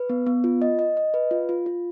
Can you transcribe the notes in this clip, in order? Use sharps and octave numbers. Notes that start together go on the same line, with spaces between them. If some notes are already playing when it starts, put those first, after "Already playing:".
Already playing: B4
B3
B3
F4
D#5
D#5
D#5
B4
F4
F4
F4